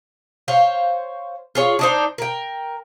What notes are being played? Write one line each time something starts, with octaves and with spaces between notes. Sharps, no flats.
C5 C#5 F5
F4 G#4 C#5
D4 D#4 C5
A#4 G5